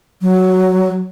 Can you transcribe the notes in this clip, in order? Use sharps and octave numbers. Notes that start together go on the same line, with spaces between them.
F#3